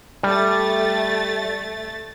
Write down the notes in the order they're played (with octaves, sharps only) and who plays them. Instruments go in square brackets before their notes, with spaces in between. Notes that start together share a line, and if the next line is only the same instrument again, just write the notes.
[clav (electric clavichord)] G3 [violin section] A3 A6